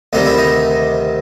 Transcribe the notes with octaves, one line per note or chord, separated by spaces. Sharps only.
D2 C3 D#3 G3 D#4
E4
D#4